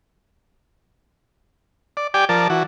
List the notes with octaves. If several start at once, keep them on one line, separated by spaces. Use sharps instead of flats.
D5
G4 D5 G5 G#5 D6
F3 A#4 D5 A5
E3 F#4